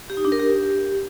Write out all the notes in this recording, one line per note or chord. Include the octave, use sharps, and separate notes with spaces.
G4
D#4
D4
A#4
G4